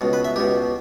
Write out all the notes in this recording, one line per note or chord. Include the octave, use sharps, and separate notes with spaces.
C#2 B2
B4
E5
C#2 B2 G4